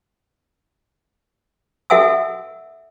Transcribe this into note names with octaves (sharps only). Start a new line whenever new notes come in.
A4 E5 F#5 G#5 E6